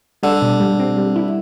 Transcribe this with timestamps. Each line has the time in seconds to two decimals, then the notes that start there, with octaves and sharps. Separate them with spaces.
0.23 D3 G3
0.42 B2
0.60 G3
0.79 C4
0.97 G3
1.16 E4